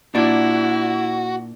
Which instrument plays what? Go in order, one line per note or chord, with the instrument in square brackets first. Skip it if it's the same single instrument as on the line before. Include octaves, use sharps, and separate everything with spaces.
[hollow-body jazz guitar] A#2 D4 [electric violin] E4 [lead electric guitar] F#4